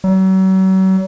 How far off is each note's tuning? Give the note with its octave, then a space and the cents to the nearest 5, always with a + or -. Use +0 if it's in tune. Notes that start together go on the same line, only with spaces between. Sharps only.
F#3 +40